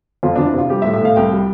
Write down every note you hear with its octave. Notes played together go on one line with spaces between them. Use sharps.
F2 F4
F2 D4
E4
C3 F4
G3 G4
E5
A2
E5
A2 F5
C2 G5
G3